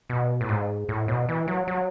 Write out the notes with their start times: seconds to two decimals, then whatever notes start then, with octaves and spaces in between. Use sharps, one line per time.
0.10 B2
0.41 A2
0.49 G#2
0.89 A2
1.08 B2
1.29 E3
1.48 F#3
1.68 F#3